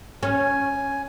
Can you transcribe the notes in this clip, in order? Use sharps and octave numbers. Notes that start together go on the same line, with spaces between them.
C#4 G#5